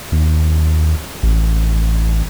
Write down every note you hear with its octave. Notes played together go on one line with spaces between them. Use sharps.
D#2
A1